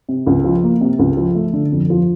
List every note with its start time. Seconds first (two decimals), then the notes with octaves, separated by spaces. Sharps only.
0.09 C3
0.27 C#2
0.44 F3
0.63 A#3
0.81 C3
0.99 C#2
1.17 F3
1.35 A3
1.53 D3
1.72 F2
1.90 F3